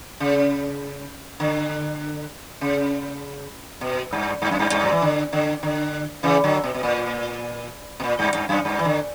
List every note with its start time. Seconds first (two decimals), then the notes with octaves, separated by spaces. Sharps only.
0.20 C#3
1.40 D3
2.61 C#3
3.81 B2
4.12 G2
4.42 G2
4.51 F#2
4.59 G2
4.72 G2
4.83 F#3
4.92 E3
5.02 D3
5.33 D3
5.63 D3
6.23 C#3 E3
6.44 D3 F#3
6.64 B2
6.74 B2
6.83 A#2
8.00 B2
8.04 A#2
8.19 G2
8.35 G2
8.49 F#2
8.65 G2
8.79 E3
8.85 D3